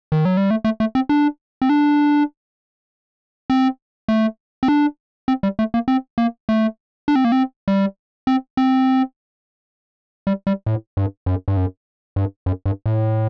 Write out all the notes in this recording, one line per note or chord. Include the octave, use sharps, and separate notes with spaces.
D#3
F#3
G3
A3
A3
A3
C4
D4
C4
D4
C4
A3
C4
D4
C4
G3
A3
A#3
C4
A#3
A3
D4
C4
A#3
C4
G3
C4
C4
G3
G3
A2
G2
F#2
G2
F#2
G2
F#2
G2
A2